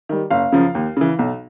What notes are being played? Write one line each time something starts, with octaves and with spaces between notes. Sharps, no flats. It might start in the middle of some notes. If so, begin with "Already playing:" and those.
D#3 G3
F#1 F5
F#2 C#3 F3
D#2
C#3 E3
B1